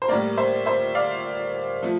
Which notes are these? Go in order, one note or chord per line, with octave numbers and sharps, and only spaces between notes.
C5
A2 G3 A#3 A#4 D5
C5 E5
C5 E5
D5 F5
F3 A3